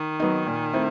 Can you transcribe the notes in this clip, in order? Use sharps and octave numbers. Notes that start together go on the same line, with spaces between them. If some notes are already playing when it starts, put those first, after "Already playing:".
Already playing: D#3
F#3 B3 D#4
A#2
A3 C4 E4